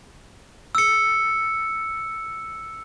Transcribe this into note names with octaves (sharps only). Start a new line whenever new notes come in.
E6 C#7